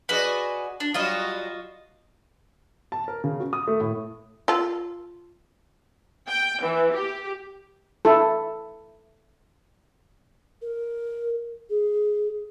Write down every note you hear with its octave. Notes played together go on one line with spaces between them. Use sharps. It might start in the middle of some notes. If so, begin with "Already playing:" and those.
F#4 G#4 B4 D5 D#5
D4
F#3 G3 F4 F#4 D#5
A5
A#4
C#3
F#4
D#6
A3
A2
F4 A4
G5
E3
G4
E4 A4
A#4
G#4